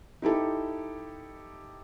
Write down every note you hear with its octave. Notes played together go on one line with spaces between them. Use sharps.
D#4 E4 G4 A4